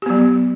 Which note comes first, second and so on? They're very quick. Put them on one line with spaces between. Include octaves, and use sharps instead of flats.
G4 B3 F#3